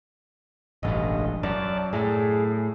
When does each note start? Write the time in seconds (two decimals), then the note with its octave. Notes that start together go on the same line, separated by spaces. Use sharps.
0.83 E1 A1 G2 D#5
1.43 F#2 D5 A5
1.93 A2 G#4